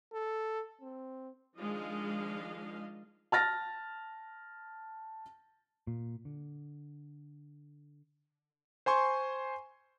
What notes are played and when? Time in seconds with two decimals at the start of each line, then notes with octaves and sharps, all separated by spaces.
0.13 A4
0.81 C4
1.58 D#3 F3 G#3 D4 D#5 F5
3.32 A5 F6 A6 A#6
5.87 A#2
6.25 D3
8.86 C5 G#5 C6 C#6